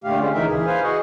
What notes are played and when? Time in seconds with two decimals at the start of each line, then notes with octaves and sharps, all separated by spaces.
0.04 A#2 D3 A3 G4 F5
0.19 D3 G#3 C#4 F4
0.34 D#2 C#3 E3 D#4 A#4 E5
0.48 E3 G#4
0.66 B4 C5 F5 G#5
0.83 F#4 G#4 D#5 F#5